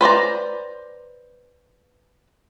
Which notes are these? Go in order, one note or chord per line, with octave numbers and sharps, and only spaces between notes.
B4 C5 D5 A#5